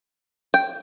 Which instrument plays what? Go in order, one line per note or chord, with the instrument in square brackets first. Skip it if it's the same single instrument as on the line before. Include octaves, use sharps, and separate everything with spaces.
[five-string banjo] G5